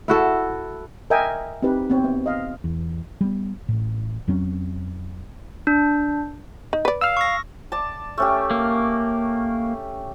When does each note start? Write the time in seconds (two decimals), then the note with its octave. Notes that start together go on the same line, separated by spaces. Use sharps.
0.08 E4 F#4 A4
1.10 A#4 D#5 E5 G5 G#5
1.62 C4 D#4 G4 B4
1.90 B3 C4 C#5
2.04 B3
2.26 D#5 F5
2.64 E2
3.21 G3 B3
3.68 A1 A2
4.28 F2 F#3 C4 C#4
5.67 D4
6.73 D#4
6.85 B4 D5
7.01 F5 E6 F6
7.17 C#6 A#6
7.72 D5 A5
8.18 A3 C#4 G4
8.51 A#3